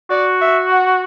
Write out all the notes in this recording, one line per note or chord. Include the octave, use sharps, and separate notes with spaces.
F#4 D5
E5
F#5